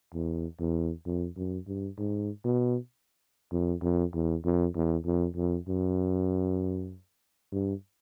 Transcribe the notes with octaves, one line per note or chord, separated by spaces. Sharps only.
E2
E2
F2
F#2
G2
G#2
B2
F2
F2
E2
F2
E2
F2
F2
F#2
G2